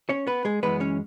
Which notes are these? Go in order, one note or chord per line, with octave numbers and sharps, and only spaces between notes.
C#4 C#5
B3 B4
G#3 G#4
F#2 E3 G#3 B3 B4
C#4 C#5